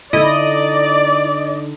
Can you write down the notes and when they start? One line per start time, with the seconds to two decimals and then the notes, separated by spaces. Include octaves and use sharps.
0.13 D3 D#4 E4 D5 D#5